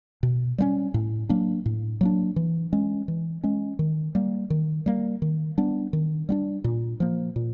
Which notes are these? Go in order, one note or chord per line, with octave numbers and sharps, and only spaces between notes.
B2
G3 A#3 C#4
A2
F#3 A#3 D4
A2
F#3 A#3 D4
E3
G#3 C#4
E3
G#3 C#4
D#3
G3 A#3
D#3
G3 A#3
D#3
G3 B3 D4
D#3
G3 B3 D4
A#2
F3 A#3
A#2